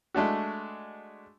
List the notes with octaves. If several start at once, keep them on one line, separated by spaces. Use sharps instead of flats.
G#3 A3 D4 F#4